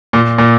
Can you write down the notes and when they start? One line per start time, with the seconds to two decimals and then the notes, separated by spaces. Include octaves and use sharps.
0.13 A#2
0.38 A#2